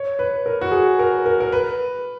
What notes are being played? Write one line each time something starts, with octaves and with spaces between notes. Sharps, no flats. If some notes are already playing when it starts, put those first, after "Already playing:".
Already playing: C#5
B4
A#4
F#4
G#4
A#4
A#4
A#4
B4